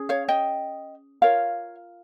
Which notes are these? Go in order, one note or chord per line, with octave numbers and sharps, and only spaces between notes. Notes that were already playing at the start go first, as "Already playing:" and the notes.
Already playing: C#4 G#4
C#5 F5
D#5 G5
F4 A#4 C#5 F5